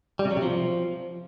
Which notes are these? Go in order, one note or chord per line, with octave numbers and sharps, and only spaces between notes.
G3
C3
F#3
C3
F3